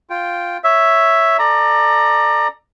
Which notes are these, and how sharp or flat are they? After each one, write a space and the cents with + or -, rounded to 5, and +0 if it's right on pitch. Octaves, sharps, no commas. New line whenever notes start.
F4 +0 G5 +0
C#5 +0 E5 +0
A4 +0 D5 +25 A#5 +0